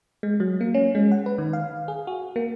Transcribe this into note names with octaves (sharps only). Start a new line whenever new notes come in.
G#3
F#3
A#3
C#4
G#3
F#5
B4
D#3
F5
G#4
F#4
A#3